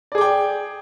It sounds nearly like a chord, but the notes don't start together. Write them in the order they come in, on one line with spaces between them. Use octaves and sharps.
D5 G#4 D6 G5